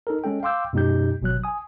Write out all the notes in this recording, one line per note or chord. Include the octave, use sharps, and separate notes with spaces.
D#4 A4 A#4
G#3 C#4 A4 G5
F5 G5 C6 D6 E6 G6
F#2 B2 G#3 D#4 G4 G6
G#1 B2 F#3 F#6
G#5 D#6